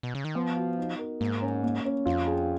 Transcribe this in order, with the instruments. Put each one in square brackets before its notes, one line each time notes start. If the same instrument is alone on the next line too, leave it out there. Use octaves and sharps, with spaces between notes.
[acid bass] B2
C#3
D#3
[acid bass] F3 [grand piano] B3
[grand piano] F#4
D#4
A#4
[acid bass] G#2 [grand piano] A#3
[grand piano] C#4
A#3
C#4
[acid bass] F2 [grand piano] F4
[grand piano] G#4